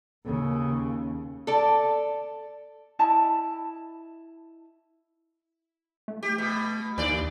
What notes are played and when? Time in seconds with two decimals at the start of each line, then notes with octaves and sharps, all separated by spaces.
0.24 D#2 C#3
1.47 A4 D5
2.99 E4 D#5 A5 B5
6.08 A3
6.23 G4
6.38 B2
6.98 D#2 D3 D5